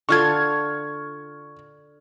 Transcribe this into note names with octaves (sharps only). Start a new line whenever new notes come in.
D3 F4 A4 C#6 F6 G#6